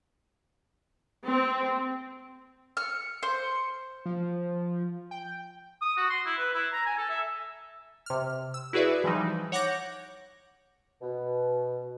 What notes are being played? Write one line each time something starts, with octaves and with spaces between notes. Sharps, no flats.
C4
F6 C#7
C5
F3
G5
D#6
F#4
C6
E4
B4
E4
A#5
G#5
A4
E5
C3 F6
E6
E4 F#4 G#4 B4 D5 E5
E3 F3 G3 D#4
C#5 F#5 D6 G6 A#6
B2